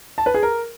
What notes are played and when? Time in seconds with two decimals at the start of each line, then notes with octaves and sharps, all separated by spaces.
0.18 A5
0.26 B4
0.34 G#4
0.43 A#4